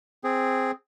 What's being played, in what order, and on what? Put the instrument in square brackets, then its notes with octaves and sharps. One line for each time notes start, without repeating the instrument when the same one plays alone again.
[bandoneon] C4 G#4